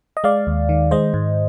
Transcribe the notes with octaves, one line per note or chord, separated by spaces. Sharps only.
D#5
G#3 D5 F5
D#2
D#3
G#3 C5 D#5
G#2